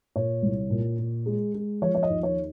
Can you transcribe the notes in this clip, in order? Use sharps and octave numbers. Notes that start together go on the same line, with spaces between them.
A#2 C#5
C2
A#2
A#2
G#3
G#3
F3 C#5
C#5
D#5
D#2
C#5